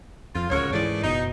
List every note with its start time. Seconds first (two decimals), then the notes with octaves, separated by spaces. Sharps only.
0.35 F2 F4
0.50 D1 C#2 C#3 F#4 A#4 C#5
0.73 G#2 E3 A3 G#4 D5
1.03 F#1 B2 D#4